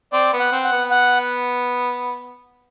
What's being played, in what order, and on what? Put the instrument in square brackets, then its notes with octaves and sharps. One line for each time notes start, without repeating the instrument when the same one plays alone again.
[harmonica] C4 [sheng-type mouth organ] D5
[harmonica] B3
[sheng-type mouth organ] F#5
[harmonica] C4
[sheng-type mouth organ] F#5
[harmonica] B3
[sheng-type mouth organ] F#5